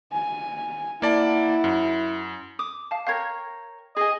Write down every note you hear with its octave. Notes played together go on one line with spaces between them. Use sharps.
G#5
A#3 E4 D5 F#5 A5
F#2
D6 D#6
F5 A5
A#4 C#5 F5 G5 G#6
G#4 D#5 G#5